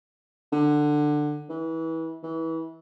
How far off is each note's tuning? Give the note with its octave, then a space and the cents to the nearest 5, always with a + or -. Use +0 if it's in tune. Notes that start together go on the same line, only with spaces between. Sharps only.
D3 +15
E3 -25
E3 -25